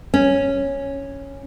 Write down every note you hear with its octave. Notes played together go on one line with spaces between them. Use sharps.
C#4